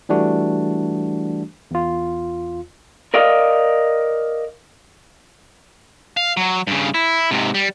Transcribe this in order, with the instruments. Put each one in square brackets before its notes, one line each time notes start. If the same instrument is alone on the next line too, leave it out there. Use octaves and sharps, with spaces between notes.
[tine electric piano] E3 G3 A3 D4 F#4
E2 F4
[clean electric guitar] A#4 D5 D#5 F5
[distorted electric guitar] F5
F#3
G2 C#3
E4
G#2 C3
G3